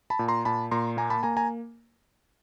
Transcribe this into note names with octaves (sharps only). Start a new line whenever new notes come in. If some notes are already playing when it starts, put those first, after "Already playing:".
A5 B5
A#2
A#5 C6
A#2 A5 B5
A#2 A#5 C6
A#3 G#5 A#5
A5 B5
A#3 G#5 A#5
G#5 A#5